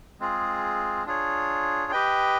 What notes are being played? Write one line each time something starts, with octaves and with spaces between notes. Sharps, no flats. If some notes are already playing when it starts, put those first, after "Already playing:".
G#3 C4 F4 G#4
D4 F4 G#4 C#5
G4 B4 D#5 G5